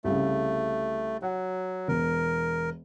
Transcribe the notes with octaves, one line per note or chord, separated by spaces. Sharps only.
C2 C#3 A3
F#3 F#5
E1 A#4